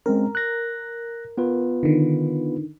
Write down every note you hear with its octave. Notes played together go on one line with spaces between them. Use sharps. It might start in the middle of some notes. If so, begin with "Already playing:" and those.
G#3 C4 C#4 A#4
F#6 A#6
B3 F4 B4
D3 D#3